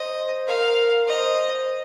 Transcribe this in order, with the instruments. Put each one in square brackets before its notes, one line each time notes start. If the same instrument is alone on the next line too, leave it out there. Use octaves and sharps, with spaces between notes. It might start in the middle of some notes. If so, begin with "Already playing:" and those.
Already playing: [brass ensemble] C5 [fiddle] D#5
[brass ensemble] A#4 [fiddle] F5
[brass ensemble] C5 [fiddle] D#5